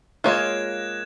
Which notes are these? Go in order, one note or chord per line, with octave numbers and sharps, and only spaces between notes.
G#3 A#3 F4 C#5 F5 F#6 G#6 E7